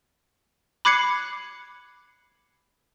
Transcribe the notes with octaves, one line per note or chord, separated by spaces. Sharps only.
B5 D6 F#6 G#6 C7 C#7